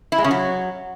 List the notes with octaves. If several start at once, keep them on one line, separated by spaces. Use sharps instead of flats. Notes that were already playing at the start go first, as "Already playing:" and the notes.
E4
G#3
C#3
F#3